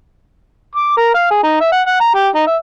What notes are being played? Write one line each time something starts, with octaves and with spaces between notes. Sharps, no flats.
D6
A#4
F5
G#4
D#4
E5
F#5
F#5
A#5
G4
D#4
E5